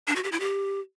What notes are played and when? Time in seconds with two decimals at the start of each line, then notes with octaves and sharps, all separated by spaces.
0.08 D4
0.16 F#4
0.24 G4
0.32 E4
0.40 G4